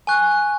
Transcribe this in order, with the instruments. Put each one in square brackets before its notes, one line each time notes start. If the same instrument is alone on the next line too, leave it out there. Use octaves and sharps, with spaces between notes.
[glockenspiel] G#5 C#6 F#6